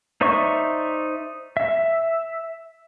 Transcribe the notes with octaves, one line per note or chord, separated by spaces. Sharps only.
D#4 C5 D5 E5 C#6
E5